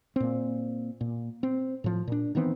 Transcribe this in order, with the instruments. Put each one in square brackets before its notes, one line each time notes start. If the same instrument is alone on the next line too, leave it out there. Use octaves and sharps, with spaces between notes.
[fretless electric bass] A#2 C4
A#2
C4
A2 F3
A#2 D4
D#3 E3 B3 C4